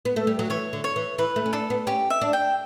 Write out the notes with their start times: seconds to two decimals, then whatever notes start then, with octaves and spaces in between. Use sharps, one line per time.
0.05 B3
0.16 A3
0.27 G3
0.39 F#3
0.50 E3 C#5
0.73 D3
0.84 C#5
0.96 E3
1.18 E3 B4
1.36 A3
1.46 C#4
1.53 D4 A4
1.70 B3
1.87 C#4 G4
2.10 E5
2.22 D4
2.33 G5